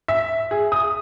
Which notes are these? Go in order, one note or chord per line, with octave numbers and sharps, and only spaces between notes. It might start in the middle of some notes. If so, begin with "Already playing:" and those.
E5
G#4
D#6